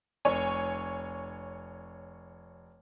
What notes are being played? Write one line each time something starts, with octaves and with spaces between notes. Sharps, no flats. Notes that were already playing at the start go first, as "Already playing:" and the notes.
F1 C#5 G#5